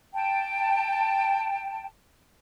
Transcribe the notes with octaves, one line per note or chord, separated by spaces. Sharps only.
G5 A5